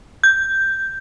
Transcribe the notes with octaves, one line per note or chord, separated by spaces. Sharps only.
G6